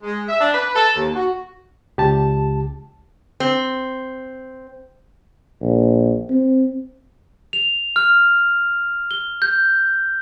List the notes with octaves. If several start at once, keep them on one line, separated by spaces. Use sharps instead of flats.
G#3
E5
D4
B4
A4
D#2
F#4
C#2 C#3 G4 A5
C4
A#1
C4
F7
F6
G7
G6